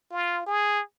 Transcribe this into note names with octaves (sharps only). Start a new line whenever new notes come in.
F4
G#4